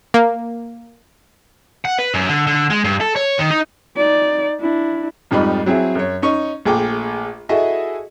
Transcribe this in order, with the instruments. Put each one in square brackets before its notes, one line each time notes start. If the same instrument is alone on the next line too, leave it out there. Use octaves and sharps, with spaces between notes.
[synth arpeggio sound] A#3
[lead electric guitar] F#5
B4
F#2
D3
D3
G#3
G2
A4
C#5
D#3
D#4
[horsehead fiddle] D#4 D5
D4 E4
[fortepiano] F2 G#2 G3 D#4 F4 B5
F#3 C4 E4 G#4
F#2 C#5
C#4 D#4 C#6
A#1 A3 G#4 G5 D6
E4 F#4 G#4 A4 D#5 E5